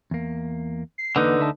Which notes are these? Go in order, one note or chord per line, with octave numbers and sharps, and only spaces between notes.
E2 A#3
C7
E2 D3 A#3 D#4 B4 F#5
D2 E5 A5